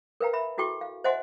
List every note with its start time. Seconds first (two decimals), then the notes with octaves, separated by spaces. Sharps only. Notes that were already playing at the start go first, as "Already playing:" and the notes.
0.21 A#4 B4 F5 G5 A#5
0.33 E5 B5
0.58 E4 F#4 A4 G5 C#6
0.81 F5
1.04 C5 D#5 E5 F#5 G#5 C6